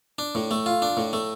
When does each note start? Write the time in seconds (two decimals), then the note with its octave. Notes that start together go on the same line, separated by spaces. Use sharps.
0.19 D4
0.35 A2
0.51 A3
0.66 F4
0.82 D4
0.97 A2
1.13 A3